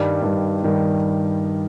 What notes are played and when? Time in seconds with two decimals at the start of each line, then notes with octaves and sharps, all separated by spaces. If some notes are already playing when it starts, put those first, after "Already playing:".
Already playing: G2 D#3 G3
0.22 G2 D#3 G3
0.63 G2 D#3 G3